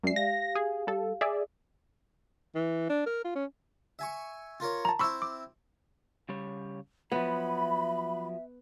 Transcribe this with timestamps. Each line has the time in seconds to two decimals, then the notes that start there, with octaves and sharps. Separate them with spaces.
0.03 F#2 G#3 D5 E5 C7
0.16 G4 F5 A#6
0.55 G#4
0.87 G3 A4
1.21 G#4 D5 E5
2.55 E3
2.90 D4
3.06 A#4
3.24 F4
3.35 C#4
3.99 E5 G#5 C#6
4.60 F4 A#4 C#5
4.85 A5 A#5
4.99 C4 E4 B5 C#6 E6
5.22 D6
6.29 C#3 G3 C#5
7.12 F3 F#3 B3 E5 B5